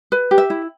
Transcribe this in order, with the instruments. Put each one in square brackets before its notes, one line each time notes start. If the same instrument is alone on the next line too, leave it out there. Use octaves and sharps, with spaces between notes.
[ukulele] B4
G4
E5
E4